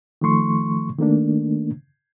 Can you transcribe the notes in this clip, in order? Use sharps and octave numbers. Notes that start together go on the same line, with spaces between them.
D#3 F3 A3 C6 C#6
D#3 A3 A#3 D4